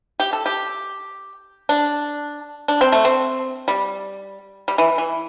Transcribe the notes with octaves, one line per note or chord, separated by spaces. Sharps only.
G4
A4
G4
D4
D4
C4
A3
C4
G3
G3
E3
E3